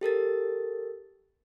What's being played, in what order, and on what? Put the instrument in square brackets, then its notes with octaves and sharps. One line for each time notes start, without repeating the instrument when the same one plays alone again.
[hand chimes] G4 A4 A#4 A6